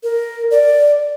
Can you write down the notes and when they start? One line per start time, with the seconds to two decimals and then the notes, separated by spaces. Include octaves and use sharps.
0.03 A#4
0.51 D5